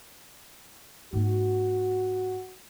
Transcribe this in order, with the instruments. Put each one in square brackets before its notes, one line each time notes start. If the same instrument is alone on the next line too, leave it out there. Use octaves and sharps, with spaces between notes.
[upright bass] G#2 A#3 [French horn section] F#4